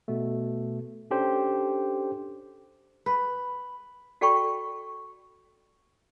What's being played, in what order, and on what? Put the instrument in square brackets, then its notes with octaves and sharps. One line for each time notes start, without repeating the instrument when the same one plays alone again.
[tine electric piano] B2 A3
C#4 D4 G4 A4 C5
[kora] B4
[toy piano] F#4 A4 D5 G5 B5 C#6